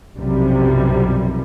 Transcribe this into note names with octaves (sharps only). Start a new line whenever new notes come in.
B1 F#2 C3 F3 G3